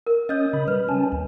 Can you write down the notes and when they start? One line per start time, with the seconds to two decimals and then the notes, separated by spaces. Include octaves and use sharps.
0.07 A#4
0.29 C#4 C#5 D#5 D#6
0.53 C#3 B5
0.68 G3 B4
0.89 C#4 G#5 A5
1.12 D#2